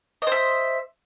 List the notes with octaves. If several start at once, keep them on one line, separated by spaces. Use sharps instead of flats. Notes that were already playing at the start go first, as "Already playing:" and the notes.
C5 D#5 E5